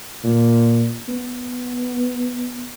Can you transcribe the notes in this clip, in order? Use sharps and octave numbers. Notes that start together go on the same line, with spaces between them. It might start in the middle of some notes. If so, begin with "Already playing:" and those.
A#2
B3